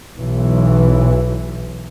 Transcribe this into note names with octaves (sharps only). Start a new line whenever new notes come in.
B1 E3